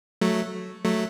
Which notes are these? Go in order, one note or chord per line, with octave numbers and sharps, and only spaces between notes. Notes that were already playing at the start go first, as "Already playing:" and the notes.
F#3 A3
F#3 A3